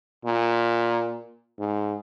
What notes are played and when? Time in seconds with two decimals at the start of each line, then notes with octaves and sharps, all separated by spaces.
0.25 A#2
1.59 G#2